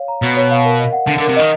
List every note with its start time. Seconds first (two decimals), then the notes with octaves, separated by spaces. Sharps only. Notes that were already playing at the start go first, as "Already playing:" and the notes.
Already playing: C#5 F5
0.08 A#5
0.22 B2 C#5
0.37 C#5
0.51 F5
0.65 A#4
0.80 D#5
0.93 F#5
1.07 D3 A5
1.18 D3
1.22 A#4
1.29 C3
1.36 D#3 D#5